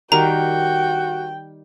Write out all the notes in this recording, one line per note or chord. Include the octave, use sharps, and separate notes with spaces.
D#3 G3 F#4 A#4 G5 A#5